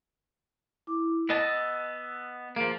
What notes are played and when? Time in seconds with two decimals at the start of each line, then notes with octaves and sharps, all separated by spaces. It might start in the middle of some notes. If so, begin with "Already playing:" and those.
0.87 E4 D6
1.29 B3 D#5 A5 E6
2.56 F3 A#3 G#4